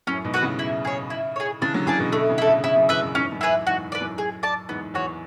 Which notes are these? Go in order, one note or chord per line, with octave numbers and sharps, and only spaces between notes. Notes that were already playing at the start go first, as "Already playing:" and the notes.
F#2 A2 C#4
G#2 B2
F#4 B4 F#5
A2 C#3
E4
G#4 C#5
E4
G#4 C#5
C#3 E3 D4
D3 F#3
C#3 E3 G#4 D5 A5
B2 D3
B2 D3 A3
C#3 E3
E4 A4
A2 C#3
A2 C#3 E4
F#2
E2 B4 E5
F#2
E2 G#2 C#4
F#2 A2
E4 G#4 B4
E2 G#2 F#4
B4 D5
F#2 A2
G#4
D5 A5
E2 G#2 B3
E2 F#4 C#5